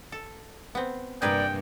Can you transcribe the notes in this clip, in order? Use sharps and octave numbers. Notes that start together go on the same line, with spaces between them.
A4
B3 C4
G2 C3 A#3 G#4 A#4 B4 D5 G5